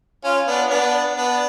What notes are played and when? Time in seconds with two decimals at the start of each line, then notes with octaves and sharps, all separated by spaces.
0.24 C#4 F4
0.47 B3 D4
0.70 B3 D4
1.16 B3 D4